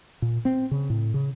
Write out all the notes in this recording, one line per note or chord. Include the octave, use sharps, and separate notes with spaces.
A#2
C4
C#3
A2
C#3